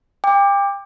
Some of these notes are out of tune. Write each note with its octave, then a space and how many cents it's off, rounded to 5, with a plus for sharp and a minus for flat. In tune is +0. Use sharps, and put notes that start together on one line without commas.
G5 +30 D6 +10